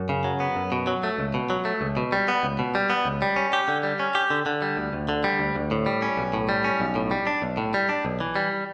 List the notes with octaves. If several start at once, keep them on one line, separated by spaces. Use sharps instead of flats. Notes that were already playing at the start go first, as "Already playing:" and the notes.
Already playing: F#2
C#3
F#3
B3
F#2
B2
F#3
A3
C#2
B2
F#3
A3
C#2
B2
G3
B3
C#2
B2
G3
B3
C#2
G3
C#4
G4
D3
G3
C#4
G4
D3
D3
G3
D2
D2
D3
G3
D2
D2
A2
G3
C#4
B1
A2
G3
C#4
B1
A2
G3
D4
B1
A2
G3
D4
B1
E3
G3